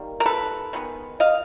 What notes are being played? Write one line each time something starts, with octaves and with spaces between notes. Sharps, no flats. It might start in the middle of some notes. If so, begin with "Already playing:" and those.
Already playing: D#3 G3 A#3
A#4
A4 B4
D#3 G#3 B3
D#5 F5